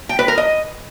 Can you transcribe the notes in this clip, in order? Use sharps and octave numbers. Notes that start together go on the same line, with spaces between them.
G5
B4
A#4
D#5